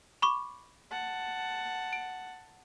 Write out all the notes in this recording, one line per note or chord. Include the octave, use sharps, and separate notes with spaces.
B5 C#6 D6
F#5 A5
D7